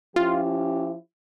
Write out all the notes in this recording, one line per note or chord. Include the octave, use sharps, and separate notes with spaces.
F3 C#4 E4 F4 G4